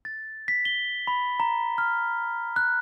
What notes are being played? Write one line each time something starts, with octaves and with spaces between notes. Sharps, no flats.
A6
B6
G7
B5
A#5
F6
F#6